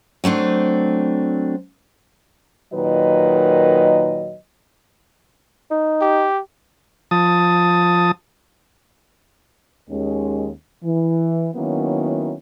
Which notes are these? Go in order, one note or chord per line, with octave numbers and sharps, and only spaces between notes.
F#3 A3 C4 D4
A#2 D#3 F#3 B4 D#5
D#4
G4
F3 A5 D#6
D#2 G#3 C#4
E3
D#3 F#3 A#3 B3 C#4 E4